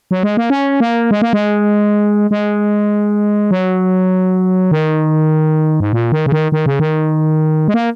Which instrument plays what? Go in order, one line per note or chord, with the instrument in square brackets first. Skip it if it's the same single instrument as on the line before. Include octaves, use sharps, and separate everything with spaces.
[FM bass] F#3
G#3
A#3
C#4
A#3
G#3
A#3
G#3
G#3
F#3
D#3
G#2
A#2
D#3
C#3
D#3
D#3
C#3
D#3
G#3
A#3